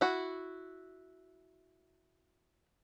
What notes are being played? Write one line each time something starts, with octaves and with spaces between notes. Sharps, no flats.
E4 F#4